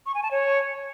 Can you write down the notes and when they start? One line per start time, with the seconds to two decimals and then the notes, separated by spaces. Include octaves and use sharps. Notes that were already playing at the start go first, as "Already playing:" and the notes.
0.06 C#6
0.14 G#5
0.23 A5
0.31 C#5